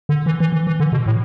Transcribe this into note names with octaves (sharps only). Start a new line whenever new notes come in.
D3
E3
E3
E3
E3
D3
B2
A2